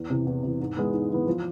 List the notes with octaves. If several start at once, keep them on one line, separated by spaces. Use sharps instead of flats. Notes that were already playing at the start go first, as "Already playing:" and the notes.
Already playing: E2
C3 E3
E2
C3 E3
G#2
E3 G#3 B3
G#2
E3 G#3 B3
F3